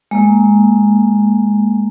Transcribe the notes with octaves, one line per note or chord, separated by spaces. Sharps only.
G#3 A#3